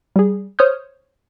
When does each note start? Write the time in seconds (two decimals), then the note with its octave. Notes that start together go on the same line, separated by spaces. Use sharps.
0.16 G3 G#4
0.59 C5 C#5 D#6 F6 G6